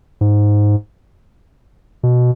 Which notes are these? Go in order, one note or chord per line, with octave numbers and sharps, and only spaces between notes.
G#2
B2